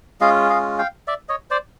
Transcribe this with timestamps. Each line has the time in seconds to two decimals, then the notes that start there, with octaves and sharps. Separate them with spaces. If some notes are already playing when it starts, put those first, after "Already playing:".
0.21 G#3 C#4 F4 D#5 F5
0.50 D#5 F5
0.79 F5 G5
1.07 D5 E5
1.29 C#5 D#5
1.51 C5 D5